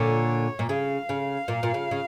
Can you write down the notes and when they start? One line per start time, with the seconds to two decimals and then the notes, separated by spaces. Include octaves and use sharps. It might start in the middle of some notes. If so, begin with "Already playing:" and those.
Already playing: A#2 D3 C#5
0.59 A#2
0.69 C#3 F5
1.09 C#3
1.48 A#2
1.63 A#2
1.74 C#3
1.91 C#3